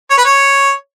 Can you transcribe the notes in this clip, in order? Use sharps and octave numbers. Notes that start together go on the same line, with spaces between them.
C#5
B4
C#5